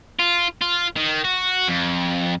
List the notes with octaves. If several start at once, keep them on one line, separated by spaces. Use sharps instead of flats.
F4
F4
D#3
F#4
F2